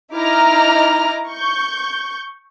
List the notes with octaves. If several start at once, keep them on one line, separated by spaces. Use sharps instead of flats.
D#4 E4 D#5 A#5 D6 F6
C#6 G6